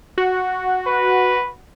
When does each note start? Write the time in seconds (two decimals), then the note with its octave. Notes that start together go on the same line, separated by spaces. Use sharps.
0.18 F#4
0.87 B4